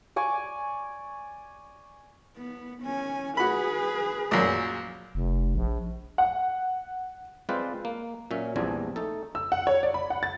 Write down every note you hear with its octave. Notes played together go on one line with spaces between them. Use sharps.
D5 G#5 C#6 D6
B3
C#4 G#5
F#4 G#4 B4 B5
A#1 F#2
F1
A#1
F#5
G#3 C4 F4 B4 C5 D5
A#3
A#2 F#3 C#4 E5
A#1 E2 G3 C4 D4 G#5
A3 D#4 A4
E6
F#5
C#5
D5
B5
F#5
A6